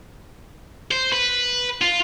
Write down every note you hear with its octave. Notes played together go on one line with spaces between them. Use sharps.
C5
B4
F4